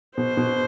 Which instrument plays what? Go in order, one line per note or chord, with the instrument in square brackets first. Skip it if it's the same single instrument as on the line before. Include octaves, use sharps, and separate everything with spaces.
[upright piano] B2 [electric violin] C5
[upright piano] B2